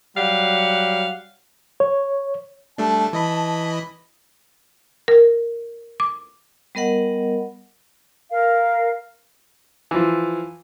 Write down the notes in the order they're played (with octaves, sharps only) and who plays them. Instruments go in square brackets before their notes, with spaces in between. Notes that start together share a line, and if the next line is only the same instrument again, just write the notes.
[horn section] F#3 G3 F5 F#5
[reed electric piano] C#5
[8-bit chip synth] G3 A3 D4 [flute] A5
[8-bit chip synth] E3 D#5 B5
[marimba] A#4
D6
[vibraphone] G3 B3 A#4 D#5 F#5
[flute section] A#4 F5
[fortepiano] E3 F3